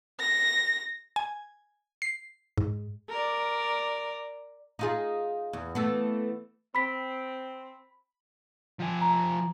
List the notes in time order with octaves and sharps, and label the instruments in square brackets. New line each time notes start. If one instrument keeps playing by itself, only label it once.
[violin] A#6
[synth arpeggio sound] G#5
C7
G#2
[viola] A#4 D5
[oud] D#4 F4 G#4
E2
E3 A3 B3
[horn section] C4 [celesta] B5 B6
[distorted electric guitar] F3 G#5
[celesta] A#5